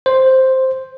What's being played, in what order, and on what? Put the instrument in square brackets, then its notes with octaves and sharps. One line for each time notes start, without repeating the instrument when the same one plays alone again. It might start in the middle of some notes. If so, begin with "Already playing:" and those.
[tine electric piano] C5